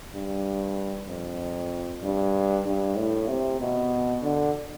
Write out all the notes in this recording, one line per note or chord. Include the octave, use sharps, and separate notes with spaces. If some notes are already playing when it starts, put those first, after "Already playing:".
G2
F2
G2
G2
A2
C3
B2
D3